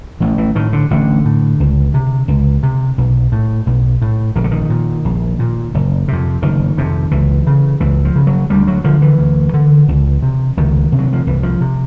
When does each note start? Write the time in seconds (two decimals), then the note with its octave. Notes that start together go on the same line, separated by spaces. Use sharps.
0.20 A1 E3
0.38 E3
0.55 A2 D#3
0.73 D3
0.91 A1 D3
1.25 A2
1.60 C#2
1.94 C3
2.28 C#2
2.63 C3
2.98 B1
3.32 A2
3.67 B1
4.02 A2
4.35 A#1 D#3
4.44 D3
4.51 D#3
4.70 A#2
5.05 A#1
5.39 A#2
5.74 F#1
6.08 F2 C3
6.42 F#1 D#3
6.78 F2 C3
7.11 C#2 E3
7.47 C#3
7.80 C#2 E3
8.05 F3
8.16 C#3
8.27 F#3
8.50 D2 G3
8.67 F#3
8.84 D3 F3
9.02 E3
9.19 D2
9.54 D3
9.88 C#2
10.22 C3
10.57 C#2 D#3
10.92 C3
10.99 F#3
11.13 F3
11.27 C2 E3
11.43 F3
11.61 C3